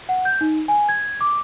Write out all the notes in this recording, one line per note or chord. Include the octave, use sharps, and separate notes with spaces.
F#5
G6
D#4
G#5
G#6
D6